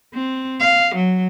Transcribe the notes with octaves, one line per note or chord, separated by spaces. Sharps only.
C4
F5
F#3